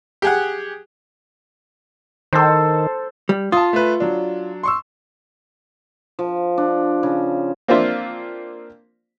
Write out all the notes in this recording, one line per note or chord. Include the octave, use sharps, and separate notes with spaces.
G4 G#4 F#5
D#3 A4 C5
G3
F4 A5 D#6
A3 B4
F#3 D4
C6 C#6 E6
F3
D4
C#3
A#3 C4 D4 F4 C5 E5